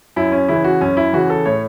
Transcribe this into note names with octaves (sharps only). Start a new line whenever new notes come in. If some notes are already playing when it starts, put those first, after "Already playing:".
F#2 E4
C#4
C#3 E3 E4
F#4
F#2 C#4
E4
C#3 E3 F#4
A4
A2 C#5